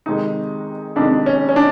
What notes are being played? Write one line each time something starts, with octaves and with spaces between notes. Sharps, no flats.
F2 C3 D#3 G#3 D#4
F2 C3 D#3 G#3 D4
C#4
C#4
D4